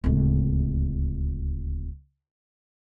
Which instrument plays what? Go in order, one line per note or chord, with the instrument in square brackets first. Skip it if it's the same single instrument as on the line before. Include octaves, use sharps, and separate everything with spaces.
[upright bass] D1 C#2